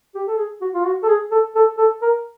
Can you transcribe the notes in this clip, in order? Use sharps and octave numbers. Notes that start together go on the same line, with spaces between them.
G4
A4
G#4
F#4
F4
F#4
A4
G#4
A4
A4
A4
A#4